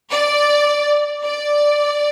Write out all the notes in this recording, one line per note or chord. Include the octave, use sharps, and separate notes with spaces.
D5
D5